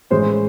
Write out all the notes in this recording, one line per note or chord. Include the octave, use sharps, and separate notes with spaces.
A2 E3 G#3 C#4 C5